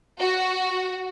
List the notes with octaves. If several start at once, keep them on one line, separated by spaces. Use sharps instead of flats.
F#4